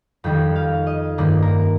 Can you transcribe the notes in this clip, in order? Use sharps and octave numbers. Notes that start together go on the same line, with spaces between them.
F2 D#3 G3 G5
F5
D#5
G2 D#3 A#3 D5
A#4